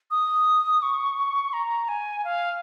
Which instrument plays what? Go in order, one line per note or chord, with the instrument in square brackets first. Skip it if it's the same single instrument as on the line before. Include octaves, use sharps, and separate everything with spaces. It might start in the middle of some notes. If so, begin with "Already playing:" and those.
[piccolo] D#6
C#6
A#5
G#5
F5